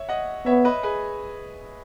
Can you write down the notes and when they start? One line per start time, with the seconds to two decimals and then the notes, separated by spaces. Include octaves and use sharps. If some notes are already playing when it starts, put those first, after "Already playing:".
Already playing: C#5 E5
0.09 D#5 F#5
0.46 B3 C#5 E5
0.65 B4 D#5
0.83 G#4 B4